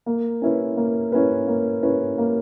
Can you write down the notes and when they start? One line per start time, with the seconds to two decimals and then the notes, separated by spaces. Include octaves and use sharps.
0.06 A#3
0.42 C#4 E4 B4
0.77 A#3
1.12 C#4 E4 B4
1.48 A#3
1.83 C#4 E4 B4
2.18 A#3